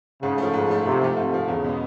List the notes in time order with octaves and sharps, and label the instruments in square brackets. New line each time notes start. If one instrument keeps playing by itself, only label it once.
[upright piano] G#2 [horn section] C#3
[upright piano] F3 A3
[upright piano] G#2 [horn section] C#3
[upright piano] F3 A3
[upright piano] G#2 [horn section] C3
[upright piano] F3 A3
[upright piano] G#2 [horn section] C3
[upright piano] F3 A3
[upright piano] E2 [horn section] C#3
[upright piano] B2 G#3 B3